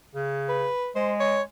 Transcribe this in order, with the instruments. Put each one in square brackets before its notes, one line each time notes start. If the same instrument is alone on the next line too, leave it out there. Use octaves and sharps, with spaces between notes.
[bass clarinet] C#3
[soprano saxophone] B4
[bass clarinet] G#3 [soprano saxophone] C5
[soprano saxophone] C#5